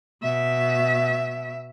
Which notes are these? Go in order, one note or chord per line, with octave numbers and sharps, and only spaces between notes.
B2 E5